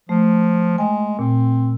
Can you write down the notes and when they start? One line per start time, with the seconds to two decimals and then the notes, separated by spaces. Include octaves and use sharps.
0.09 F3 A3
0.78 G#3 G5 G#5
1.19 A#2 C4